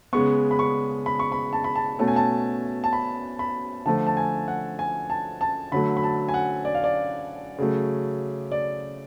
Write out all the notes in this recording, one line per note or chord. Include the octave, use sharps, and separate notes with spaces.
C#3 G#3 B3 C#6
B5
C#6
B5
C#6
B5
A5
B5
A5
B2 A3 C#4 A5
G#5
A5
A5
B5
B5
D3 F3 A3 A5
A5
G#5
F#5
G#5
A5
A5
D3 F#3 A3 B5
B5
A5
G#5
F#5
D5
F5
D5
C#3 F#3 A3
D5